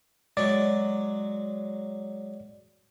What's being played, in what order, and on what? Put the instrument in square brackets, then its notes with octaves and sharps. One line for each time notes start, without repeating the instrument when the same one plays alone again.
[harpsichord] F#3 G#3 [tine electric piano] D5